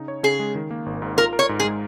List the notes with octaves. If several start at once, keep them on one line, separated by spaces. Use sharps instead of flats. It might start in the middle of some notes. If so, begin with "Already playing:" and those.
Already playing: C#3 D#4
C#5
C#3 G#4
G#3
D#3
A#3
G#1
G#2
F4 A#4
A#4
C#5
G#2
G#4
G#3